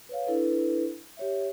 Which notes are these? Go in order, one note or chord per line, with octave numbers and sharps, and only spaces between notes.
B4 C#5 F5
D4 E4 A4 B4
G4 C#5 E5